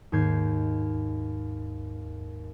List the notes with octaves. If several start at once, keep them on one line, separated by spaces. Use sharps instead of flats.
D#2 G#2 G6 G#6 C7